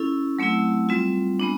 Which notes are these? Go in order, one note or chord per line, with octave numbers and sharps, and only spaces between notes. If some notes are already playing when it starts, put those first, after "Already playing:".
Already playing: C#4 E4 A4
F#3 A3 C4 E4
G3 C4 F4
G#3 B3 D4